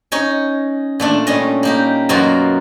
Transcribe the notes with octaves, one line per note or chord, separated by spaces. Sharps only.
C#4 D#4 C#5
A#2 A3 D4
G3 C#4 D#5
A#3 D#4 G4
F#2 B2 A#3 F4 F#4 A#4